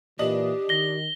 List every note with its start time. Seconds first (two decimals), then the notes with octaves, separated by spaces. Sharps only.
0.19 A#2 E3 D4 G4 D#5 F#7
0.69 D#3 A#6 G7